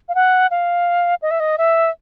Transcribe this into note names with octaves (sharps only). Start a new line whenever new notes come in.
F5
F#5
F5
D#5
E5
D#5
E5